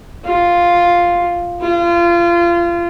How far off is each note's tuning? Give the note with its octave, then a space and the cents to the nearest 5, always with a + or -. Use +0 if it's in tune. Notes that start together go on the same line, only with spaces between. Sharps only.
F4 +0
F4 -25